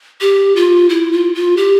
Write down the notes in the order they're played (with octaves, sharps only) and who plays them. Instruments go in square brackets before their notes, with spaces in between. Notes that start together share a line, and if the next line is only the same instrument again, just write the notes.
[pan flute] G4
F4
E4
F4
F4
G4